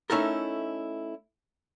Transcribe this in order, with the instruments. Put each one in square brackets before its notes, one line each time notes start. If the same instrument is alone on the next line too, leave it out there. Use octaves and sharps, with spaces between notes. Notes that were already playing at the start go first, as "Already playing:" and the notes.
[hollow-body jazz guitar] A3 C#4 D#4 E4 A4 A#4